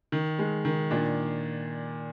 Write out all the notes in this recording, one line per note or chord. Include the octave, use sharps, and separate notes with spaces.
D#3
G#3
D#3
A#2 D4